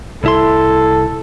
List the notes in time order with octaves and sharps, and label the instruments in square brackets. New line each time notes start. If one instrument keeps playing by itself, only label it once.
[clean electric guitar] C2 E4 C6 [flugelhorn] A4